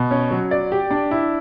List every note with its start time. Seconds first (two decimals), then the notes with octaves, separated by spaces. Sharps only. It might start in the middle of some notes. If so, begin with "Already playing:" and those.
Already playing: B2
0.11 C#4
0.31 F#3
0.51 D5
0.72 G4
0.91 D4
1.11 E4